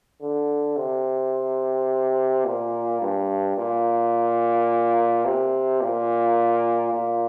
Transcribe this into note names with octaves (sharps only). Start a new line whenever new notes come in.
D3
C3
A#2
G2
A#2
C3
A#2
A#2